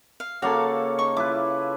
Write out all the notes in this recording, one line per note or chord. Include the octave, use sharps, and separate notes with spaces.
F5
C#3 A#3 F#4 A4 D5 F5
D#4 C#5 C#6
E4 F4 B4 D6